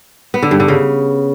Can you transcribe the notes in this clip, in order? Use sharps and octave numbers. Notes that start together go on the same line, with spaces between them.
B3
D3
G2
D3
C#3